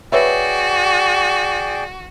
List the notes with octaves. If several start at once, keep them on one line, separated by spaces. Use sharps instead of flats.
F#4 G#4 B4 C#5 D5 E5 G5